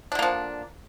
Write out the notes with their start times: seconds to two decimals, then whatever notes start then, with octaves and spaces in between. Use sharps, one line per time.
0.12 D4
0.15 D3
0.19 A#3
0.22 F3